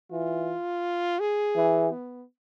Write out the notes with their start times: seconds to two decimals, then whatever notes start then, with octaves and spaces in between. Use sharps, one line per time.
0.12 E3 F4
1.19 G#4
1.56 E3
1.91 B3